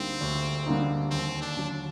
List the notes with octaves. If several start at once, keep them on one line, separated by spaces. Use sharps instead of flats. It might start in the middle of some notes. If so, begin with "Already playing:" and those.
Already playing: D2 D3 G3 A#3 C4 D#4
D2
D3 G3 A#3 D#4
D#2 C4
D4
D3 F#3